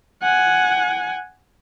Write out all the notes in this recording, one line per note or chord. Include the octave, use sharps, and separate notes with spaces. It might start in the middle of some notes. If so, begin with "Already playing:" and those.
F#5 G#5